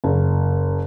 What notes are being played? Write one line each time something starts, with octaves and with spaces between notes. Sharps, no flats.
F#1